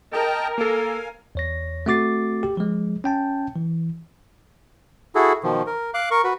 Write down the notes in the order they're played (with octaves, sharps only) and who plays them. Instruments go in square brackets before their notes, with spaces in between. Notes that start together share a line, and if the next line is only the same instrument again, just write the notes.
[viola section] A#4 [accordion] D#5 G5 A5
[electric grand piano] A#3 A4 [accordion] F5 G#5
[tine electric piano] E2 C#5 A#6
A3 C4 F#4 D6 A6 C7
G4
F3 G#3
C#4 G5 A5
E3
[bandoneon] E4 F#4 G#4 A4
B2 D#3 F3
A#4
F5 D6 F#6
A#4 C#6
F#4 B4